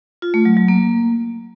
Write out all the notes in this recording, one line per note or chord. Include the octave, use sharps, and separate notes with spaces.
F4
A3
F#3
F#3
A#3